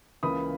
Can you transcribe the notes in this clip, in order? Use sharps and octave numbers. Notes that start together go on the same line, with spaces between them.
C#2 C#3 E3 A#3 B5 D#6